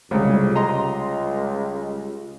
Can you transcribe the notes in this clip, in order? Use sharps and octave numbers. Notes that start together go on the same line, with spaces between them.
C2 F2 C#3 G3 G#3
C#2 D#5 A#5 C6